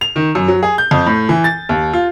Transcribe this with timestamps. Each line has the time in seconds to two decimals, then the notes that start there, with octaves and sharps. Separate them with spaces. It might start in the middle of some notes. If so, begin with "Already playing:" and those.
0.01 F7
0.16 D#3
0.35 F#2
0.48 F#3
0.63 G#4
0.78 G6
0.91 F2
1.06 A2
1.29 E3
1.44 A6
1.69 D#2
1.93 F4